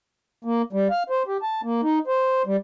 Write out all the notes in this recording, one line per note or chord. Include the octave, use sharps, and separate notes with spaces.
A#3
G3
F5
C5
G4
A5
A#3
D#4
C5
G3